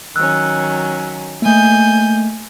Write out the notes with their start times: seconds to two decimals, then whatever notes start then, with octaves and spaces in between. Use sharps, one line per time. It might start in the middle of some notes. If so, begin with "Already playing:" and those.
0.16 D#3 F#3 C#4 E6 F#6
1.42 A3 A#3 G#5 G6